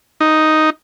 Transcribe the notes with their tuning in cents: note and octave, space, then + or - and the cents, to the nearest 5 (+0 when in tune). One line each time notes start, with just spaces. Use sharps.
D#4 +0